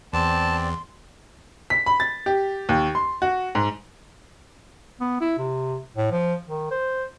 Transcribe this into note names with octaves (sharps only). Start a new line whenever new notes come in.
E2 C4 D5 A5 C6
B6
B5
A6
G4
D#2
C6
F#4
G#2
B3
E4
C3
A2
F3
D#3
C5